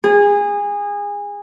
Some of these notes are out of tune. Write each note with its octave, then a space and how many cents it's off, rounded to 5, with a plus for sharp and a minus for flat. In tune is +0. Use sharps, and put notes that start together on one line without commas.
G#4 -25